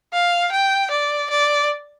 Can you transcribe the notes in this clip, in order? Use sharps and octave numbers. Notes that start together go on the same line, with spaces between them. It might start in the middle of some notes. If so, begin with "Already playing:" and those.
F5
G5
D5
D5